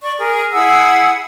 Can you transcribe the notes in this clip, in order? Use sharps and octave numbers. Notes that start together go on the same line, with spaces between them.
D5 C#6
G#4 A#4
E4 G#4 F#5 E6